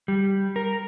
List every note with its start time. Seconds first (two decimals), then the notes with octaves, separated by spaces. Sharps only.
0.08 G3
0.56 A#4